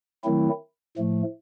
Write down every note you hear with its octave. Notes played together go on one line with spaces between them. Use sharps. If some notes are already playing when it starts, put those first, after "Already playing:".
D#3 F#3 A3 C4 E4
A2 F3 A3